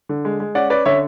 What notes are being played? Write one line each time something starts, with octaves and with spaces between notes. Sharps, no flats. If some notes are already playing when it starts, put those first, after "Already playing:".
D3
G#3
G#3
C#4 D5 F#5
C#4 B4 D5
D3 C#5 E5